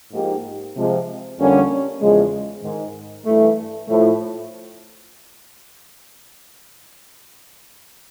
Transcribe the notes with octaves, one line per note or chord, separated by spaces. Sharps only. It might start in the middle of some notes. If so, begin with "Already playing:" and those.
G#2 F3 A#3 D#4 G4
C3 F3 G#3
F2 D3 G3 A#3 C#4
E2 C#3 F3 G#3
G#2 D#3 G#3
G2 E3 A3
A2 F3 A3